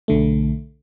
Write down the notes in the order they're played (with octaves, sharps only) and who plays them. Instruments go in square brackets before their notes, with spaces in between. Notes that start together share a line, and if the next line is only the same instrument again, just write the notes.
[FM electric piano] B1 D3 A3